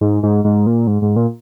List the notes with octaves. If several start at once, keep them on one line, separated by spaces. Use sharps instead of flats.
G#2
G#2
G#2
A#2
G#2
G#2
A#2